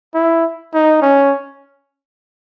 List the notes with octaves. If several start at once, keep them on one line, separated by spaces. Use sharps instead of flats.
E4
D#4
C#4